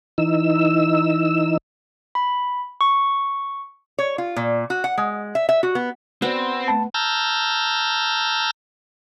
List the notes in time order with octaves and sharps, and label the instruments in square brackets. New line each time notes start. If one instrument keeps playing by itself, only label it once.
[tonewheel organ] E3 D#4 E6
[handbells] B5
C#6
[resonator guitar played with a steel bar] C#5
F4
A#2
F#4
F#5
G#3
E5
E5
F#4
B3
[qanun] B3 [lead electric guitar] C4 [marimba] F#4 D5
[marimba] A3 B3 [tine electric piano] A5
[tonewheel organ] A5 A#5 E6 F6 G6